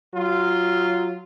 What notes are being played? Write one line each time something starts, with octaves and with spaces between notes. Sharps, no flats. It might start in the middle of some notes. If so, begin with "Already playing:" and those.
F#3 F4